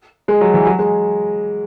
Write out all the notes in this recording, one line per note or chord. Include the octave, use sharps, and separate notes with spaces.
G#3
F#3
E3
F#3
G#3